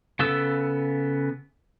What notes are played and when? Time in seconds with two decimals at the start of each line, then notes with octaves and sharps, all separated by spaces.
0.19 C#3 B3 A4 E6